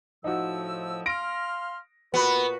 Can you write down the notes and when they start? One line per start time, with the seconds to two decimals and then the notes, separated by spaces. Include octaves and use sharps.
0.24 A2 F3 D#4 F#4 E6
1.06 F5 C6 F6 A#6 D7
2.14 A#2 B3 F#4 B4